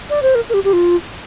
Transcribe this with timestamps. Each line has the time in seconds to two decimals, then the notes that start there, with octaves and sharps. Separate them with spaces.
0.10 D5
0.22 C5
0.35 A#4
0.49 A#4
0.54 G4
0.64 G4
0.73 F4